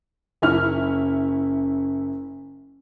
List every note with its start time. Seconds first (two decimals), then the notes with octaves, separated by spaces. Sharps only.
0.42 F#1 C#4 E4 F6